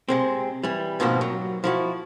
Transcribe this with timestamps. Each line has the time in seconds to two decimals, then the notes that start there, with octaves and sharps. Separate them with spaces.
0.08 C3 G#3 C4
0.64 E3 G3
1.00 G#2 B2 D#3 F3 A#3 C4
1.21 F#3
1.64 F3 E4 F#4